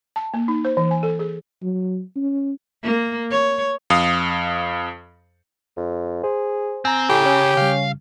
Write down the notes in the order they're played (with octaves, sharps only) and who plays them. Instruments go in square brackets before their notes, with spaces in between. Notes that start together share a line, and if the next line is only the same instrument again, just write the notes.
[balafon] A5
A#3
D#4
C5
E3
G#5
A4
G#4
[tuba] F#3
C#4
[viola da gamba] A#3
C#5
[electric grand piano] F2 F5 D#6
[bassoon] F2
[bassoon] G#4 [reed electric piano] C5
[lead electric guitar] C4 [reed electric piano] G#5 A#5
[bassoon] A2 [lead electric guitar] C#3 [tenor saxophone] G4
[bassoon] C#4
[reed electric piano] C#3 G3 [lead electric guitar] F5